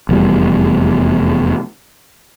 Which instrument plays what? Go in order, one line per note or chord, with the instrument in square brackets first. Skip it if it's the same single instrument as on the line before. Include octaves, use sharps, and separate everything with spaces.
[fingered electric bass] F1 E2 G3